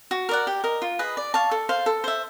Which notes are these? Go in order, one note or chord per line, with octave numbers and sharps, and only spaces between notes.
F#4
A#4 D5 F#5
G4
A#4 D#5
F4
G#4 B4 D#5
D5
F5 A5 C#6
A4
C5 F5
A4
C5 E5